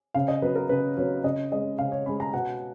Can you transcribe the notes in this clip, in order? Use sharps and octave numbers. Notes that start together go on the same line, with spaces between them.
C#3 F5
D#5
F#3 B3 B4
A#4
C#3 B4
F#3 B3 C#5
C#3 D#5
G#3 C#4 D#5
C#3 F5
C#5
G#3 C#4 B5
A#5
B2 F#5